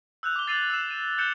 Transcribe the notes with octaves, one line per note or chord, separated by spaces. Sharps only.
E6 F#6 G6 F7
D6 G7
E6 A6 C7 D#7 F7 F#7
E6 C7 E7
D#7
F#6 G6 A6 C#7 E7 G7